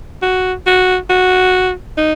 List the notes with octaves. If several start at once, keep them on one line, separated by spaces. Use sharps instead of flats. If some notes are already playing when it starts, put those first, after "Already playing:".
F#4
F#4
F#4
D#4